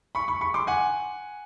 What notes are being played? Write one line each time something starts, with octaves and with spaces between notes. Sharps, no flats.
B5 C#6
B5 C#6
B5 C#6
C6 D6
F#5 G#5